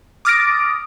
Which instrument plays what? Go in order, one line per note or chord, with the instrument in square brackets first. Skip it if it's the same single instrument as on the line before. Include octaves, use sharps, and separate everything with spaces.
[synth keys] D6 D#6 F6 A6 A#6 D7